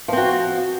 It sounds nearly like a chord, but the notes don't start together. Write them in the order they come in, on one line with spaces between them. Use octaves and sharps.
F3 C4 F#4